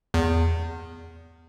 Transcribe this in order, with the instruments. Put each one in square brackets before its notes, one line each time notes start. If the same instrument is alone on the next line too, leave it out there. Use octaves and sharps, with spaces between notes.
[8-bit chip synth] E2